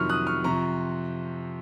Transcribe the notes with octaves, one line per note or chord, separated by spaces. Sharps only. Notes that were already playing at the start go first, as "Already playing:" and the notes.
Already playing: F2 C3 D#3 F#3 C#6 F6
D#6 F#6
C#6 F6
F2 C3 F3 C4 A#5 C#6